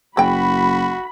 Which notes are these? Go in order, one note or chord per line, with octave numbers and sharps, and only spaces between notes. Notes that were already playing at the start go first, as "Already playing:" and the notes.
F#1 F#4 G#4 D5 G5 B5